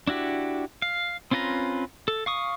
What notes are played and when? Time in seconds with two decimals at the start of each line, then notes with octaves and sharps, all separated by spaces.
0.07 D4 E4 F#4 G4
0.82 F5
1.31 C4 C#4 F4 B4 A#5
2.08 A4
2.26 F5 C#6 D#6